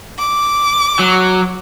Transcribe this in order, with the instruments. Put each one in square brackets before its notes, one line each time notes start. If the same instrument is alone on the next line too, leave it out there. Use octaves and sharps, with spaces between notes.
[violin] D6
[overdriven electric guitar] F#3